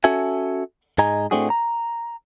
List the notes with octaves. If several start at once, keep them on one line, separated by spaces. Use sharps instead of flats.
C#4 F#4 A4 E5 G#5
G#2 G#3 D#5 G#5 A#5
A2 A3 C4 D4 F#4 G#4
A#5